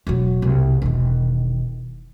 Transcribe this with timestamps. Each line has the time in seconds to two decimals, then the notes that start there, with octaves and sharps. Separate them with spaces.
0.07 E1 F#3
0.42 C2
0.82 E1 D#3